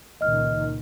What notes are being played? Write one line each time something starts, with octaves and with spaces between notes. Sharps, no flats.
C#2 A#2 D#3 D#5 F6